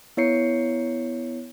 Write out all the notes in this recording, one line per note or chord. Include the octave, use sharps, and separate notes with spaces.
B3 E4 C#5 C7 C#7